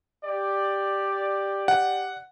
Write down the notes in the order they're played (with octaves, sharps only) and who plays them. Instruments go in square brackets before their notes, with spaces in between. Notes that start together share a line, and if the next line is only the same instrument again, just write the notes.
[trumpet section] G4 D5
[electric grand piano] F#5